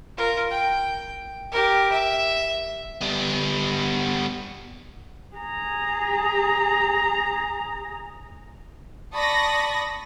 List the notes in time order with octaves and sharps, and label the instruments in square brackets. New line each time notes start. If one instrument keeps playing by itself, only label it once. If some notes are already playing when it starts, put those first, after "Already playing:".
[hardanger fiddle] F4 A#4
G5
G4 A#4
E5
[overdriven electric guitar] G3 B3
[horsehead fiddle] G#4 A#5
[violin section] D5 A5 B5 C#6 D#6 A#6